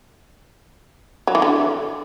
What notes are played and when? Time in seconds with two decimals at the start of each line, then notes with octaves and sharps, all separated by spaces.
1.27 F#3
1.35 E3
1.42 D3